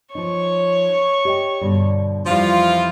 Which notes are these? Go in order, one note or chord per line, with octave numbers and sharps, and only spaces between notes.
F3 D#4 C#5 C#6
G4 D#5 G5
G2 B2 D3
F2 E3 F3 G3 E4 F4